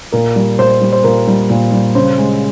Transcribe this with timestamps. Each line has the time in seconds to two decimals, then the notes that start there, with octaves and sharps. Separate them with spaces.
0.12 A#2 A#4
0.36 G3
0.59 A#2 C5
0.81 G3
0.93 C5
1.04 A#2 A#4
1.27 G3
1.50 A#2
1.72 G3
1.95 C#3 C5
2.18 G#3